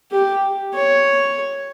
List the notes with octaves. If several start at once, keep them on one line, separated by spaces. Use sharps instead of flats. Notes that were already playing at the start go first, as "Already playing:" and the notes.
G4
C#5